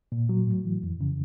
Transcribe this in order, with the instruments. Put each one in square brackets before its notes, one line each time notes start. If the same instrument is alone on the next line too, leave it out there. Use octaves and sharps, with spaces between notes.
[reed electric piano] A#2
F#3
A2
E3
F2
C#3